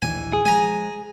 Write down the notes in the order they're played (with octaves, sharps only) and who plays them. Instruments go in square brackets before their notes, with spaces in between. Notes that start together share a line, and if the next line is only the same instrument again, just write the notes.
[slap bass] A#1 D#2 E3 [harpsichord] G#5
[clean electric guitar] G#4
[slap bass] F3 G#3 [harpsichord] G#5 A#5